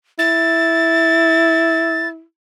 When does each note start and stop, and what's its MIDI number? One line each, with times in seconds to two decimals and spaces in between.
0.19 2.23 64
0.19 2.08 93